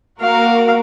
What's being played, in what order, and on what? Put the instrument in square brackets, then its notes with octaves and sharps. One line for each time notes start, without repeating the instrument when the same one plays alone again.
[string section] A#3 F#4 A#4 [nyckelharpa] F5